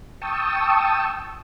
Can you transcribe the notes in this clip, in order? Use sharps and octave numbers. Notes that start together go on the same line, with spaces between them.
G5 A5 C#6 D#6 E6